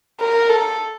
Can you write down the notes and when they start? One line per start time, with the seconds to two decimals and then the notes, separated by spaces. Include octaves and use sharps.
0.20 A#4
0.49 A4